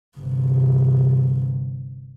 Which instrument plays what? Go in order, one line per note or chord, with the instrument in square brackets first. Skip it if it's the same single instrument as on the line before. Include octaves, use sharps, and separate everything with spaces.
[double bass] G1 C3